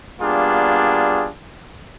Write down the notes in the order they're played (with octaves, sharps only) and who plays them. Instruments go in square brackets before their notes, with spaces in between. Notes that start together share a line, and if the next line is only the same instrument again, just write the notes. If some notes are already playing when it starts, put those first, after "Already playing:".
[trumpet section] G3 A#3 B3 D4 F4 G#4